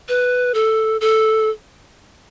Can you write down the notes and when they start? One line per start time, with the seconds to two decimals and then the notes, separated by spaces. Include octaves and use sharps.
0.09 B4
0.54 A4
1.01 A4